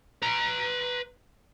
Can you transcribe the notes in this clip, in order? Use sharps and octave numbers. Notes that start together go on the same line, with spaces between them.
B4 A#5